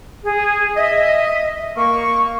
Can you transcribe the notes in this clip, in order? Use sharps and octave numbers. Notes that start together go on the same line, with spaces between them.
G#4
D#5 E5
A#3 C#6